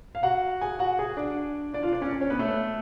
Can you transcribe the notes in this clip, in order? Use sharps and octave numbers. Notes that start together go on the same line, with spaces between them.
F5
F#4 F#5
G#4 G#5
F#4 F#5
G#4 G#5
D4 D5
D4 D5
F4 F5
D4 D5
C#4 C#5
D4 D5
C#4 C#5
B3 B4
A3 A4